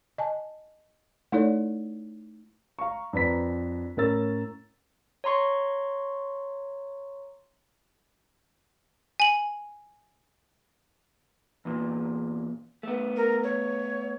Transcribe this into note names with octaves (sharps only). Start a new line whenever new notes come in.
D#5 G#5 A5
A3 D#4 E4 A4 C#5 D5
F5 A#5 C#6
F2 D4 B4 A#5 B5 B6
A2 C#4 A#4 E6 A6
C#5 A#5 C6 C#6
G#5 F#7
E2 A#2
A3 B3
A#4
C#5